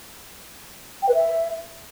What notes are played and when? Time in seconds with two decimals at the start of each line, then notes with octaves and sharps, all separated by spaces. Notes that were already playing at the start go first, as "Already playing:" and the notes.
1.02 G5
1.08 B4
1.14 E5